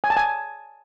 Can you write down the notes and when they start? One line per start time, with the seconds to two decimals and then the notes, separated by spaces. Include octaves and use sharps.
0.04 G#5
0.10 A5
0.17 G#5